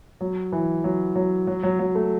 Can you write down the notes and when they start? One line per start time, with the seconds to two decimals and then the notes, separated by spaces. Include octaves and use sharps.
0.21 F#3
0.52 E3
0.84 F#3
1.16 F#3
1.47 F#3
1.63 F#3
1.79 F#3
1.95 A3